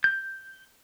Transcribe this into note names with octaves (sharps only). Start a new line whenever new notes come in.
G6